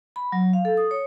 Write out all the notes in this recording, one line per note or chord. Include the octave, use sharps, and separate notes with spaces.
B5
F#3
F5
A4
D#6
C#5